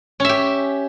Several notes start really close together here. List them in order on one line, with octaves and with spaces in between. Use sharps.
C#4 E5 G4